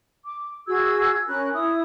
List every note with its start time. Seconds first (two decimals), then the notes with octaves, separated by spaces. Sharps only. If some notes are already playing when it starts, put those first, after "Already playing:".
0.24 D6
0.67 F#4 G#4 E6 G#6
1.27 C#4 A#4 B5 F#6
1.53 E4 D#6